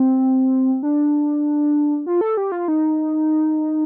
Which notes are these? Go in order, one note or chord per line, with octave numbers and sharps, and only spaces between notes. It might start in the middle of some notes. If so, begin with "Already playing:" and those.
Already playing: C4
D4
F4
A4
G4
F4
D#4